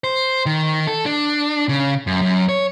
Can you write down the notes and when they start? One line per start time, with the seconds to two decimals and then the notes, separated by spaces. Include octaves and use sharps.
0.04 C5
0.46 D#3
0.87 A4
1.06 D4
1.69 C#3
2.07 F#2
2.21 F#2
2.49 C#5